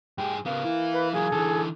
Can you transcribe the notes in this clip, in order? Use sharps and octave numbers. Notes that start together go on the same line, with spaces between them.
G2 G4 G#4
C#3 A#3 B3
E3 E4
B4
E3 F#3 A#3 G#4
D3 E3 A4